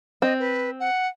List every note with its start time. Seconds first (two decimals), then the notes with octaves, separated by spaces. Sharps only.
0.22 C4 D#5
0.40 B4
0.80 F#5